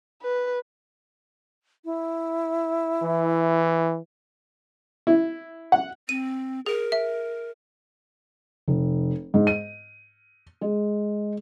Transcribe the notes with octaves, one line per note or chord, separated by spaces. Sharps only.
B4
E4
E3
E4
F#5
C4 D#7
G#4 A#4
E5
F1
G#2
D#7
G#3